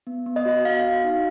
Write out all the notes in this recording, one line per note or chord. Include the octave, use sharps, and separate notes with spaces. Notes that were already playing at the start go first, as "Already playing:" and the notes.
B3
B3
D#5
F#4
B3 F5
F#4
D#4